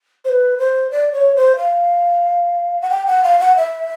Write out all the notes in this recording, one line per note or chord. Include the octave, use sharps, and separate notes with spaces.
C5
B4
C5
D5
C#5
C5
F5
F#5
G5
F#5
F5
F#5
E5